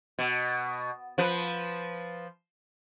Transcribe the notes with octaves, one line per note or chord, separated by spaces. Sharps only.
B2
F3 B4